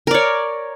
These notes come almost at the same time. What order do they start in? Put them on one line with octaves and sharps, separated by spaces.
A#4 D5 C#5